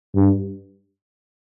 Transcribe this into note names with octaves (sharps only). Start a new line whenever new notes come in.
G2